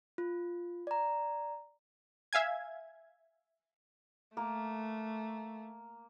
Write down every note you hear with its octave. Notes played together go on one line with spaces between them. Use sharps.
F4
D5 A#5
E5 F5 G#5 G#6
A3 A#3